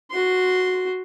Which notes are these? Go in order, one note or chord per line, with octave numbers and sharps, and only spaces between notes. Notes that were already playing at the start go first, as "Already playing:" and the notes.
F#4 C6